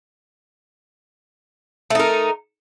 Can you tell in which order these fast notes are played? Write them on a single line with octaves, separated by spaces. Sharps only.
A3 D#4 A#4